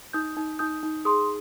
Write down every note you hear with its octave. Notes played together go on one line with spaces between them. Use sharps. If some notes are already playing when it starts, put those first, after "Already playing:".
D#4 D#6 G6
D#4
D#4 D#6 G6
D#4
G#4 C6 D#6